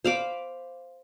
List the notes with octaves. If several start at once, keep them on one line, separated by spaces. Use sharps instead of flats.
C5 F5 B5 D6